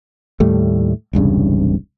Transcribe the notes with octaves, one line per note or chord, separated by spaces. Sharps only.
D#2 A2 G3 A3
E1 C2 G2 C#3